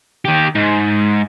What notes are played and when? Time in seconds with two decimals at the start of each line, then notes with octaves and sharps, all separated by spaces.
0.25 D#3 G4
0.55 G#2